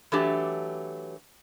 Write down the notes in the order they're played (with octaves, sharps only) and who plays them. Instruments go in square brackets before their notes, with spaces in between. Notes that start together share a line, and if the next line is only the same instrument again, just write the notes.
[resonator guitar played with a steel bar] E3 F#3 A3 D4 G4